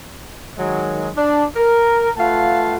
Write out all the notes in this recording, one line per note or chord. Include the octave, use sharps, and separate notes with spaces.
D#3 F#3 G#3
D4
A#4
A3 F4 B4 F5 F#5 A5